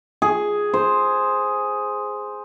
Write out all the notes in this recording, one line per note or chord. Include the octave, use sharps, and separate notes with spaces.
G#4
C5